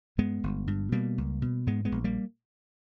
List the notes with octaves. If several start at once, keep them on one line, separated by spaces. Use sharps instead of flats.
G2 G#3 B3
G1
G2
B2 G3 A#3
C#2
B2
G#2 G#3 B3
G#3 B3
A#1
G3 A#3